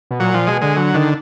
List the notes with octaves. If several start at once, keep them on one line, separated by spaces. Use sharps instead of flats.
B2
A#2 F#3
A#2 F3
B2 G#3
D3 G#3
D3 F#3
D3 D#3